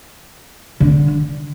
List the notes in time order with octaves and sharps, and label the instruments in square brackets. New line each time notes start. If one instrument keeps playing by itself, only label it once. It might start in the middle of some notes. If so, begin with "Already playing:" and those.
[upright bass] D3